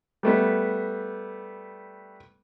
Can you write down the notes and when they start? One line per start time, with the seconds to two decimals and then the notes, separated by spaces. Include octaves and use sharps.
0.23 G3 A3 B3